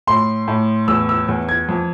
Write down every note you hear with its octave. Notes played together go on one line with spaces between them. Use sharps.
A2 C6
A2
E2 E6
E6
E2
G#6
F2